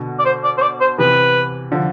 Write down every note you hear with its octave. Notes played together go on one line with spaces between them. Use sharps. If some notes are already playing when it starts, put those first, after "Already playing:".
Already playing: B2 D3
D5
C5
D5
C5
D5
C5
C3 E3 B4
D3 F3